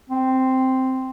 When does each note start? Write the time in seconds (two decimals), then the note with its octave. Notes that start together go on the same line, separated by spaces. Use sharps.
0.10 C4